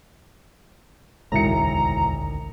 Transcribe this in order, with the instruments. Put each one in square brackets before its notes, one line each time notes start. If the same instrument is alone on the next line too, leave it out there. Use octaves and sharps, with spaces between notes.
[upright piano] E1 E4 C#7 [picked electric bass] A1 D2 D#3 [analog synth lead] A#5